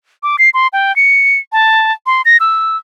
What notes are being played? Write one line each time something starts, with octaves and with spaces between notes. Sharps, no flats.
D6
C7
C6
G5
C#7
A5
C6
A#6
E6